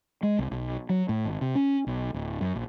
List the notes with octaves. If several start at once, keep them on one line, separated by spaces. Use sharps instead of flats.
G#3
C2
B1
F#3
A2
G#1
C3
C#4
B1
D1
F#2
A#1